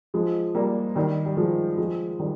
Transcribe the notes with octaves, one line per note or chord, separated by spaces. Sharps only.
F3 G#3
G3 A#3
D#3 G3
G3
F3 G#3
F3 G#3
D#3 G3